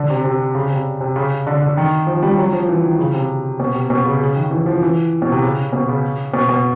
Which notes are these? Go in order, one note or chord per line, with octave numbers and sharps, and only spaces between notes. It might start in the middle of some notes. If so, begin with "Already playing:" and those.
Already playing: D3
C3
C3
C#3
C3
C3
C#3
D3
D3
D#3
F3
G3
F#3
F3
E3
D#3
C#3
C3
B2
C3
B2
C#3
C#3
D#3
E3
F3
E3
B2
C3
C#3
B2
C#3
B2
B2